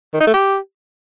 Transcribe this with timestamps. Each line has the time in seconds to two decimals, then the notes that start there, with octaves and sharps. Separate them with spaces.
0.13 D#3
0.20 D#4
0.27 A3
0.34 G4